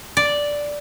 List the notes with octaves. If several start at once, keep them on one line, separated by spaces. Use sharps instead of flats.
D5